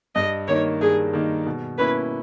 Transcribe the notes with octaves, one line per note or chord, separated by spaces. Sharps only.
G2 D#5
D#3 A#3 D#4 C#5
G2 G#4
D#3 A#3 D#4
B2
A#3 C#4 E4 B4